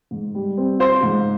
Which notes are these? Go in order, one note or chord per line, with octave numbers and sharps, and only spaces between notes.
G#2
G3
C4
F4 C5
G#2